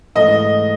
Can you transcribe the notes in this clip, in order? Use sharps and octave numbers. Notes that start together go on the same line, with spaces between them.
G#2 E3 A3 D#5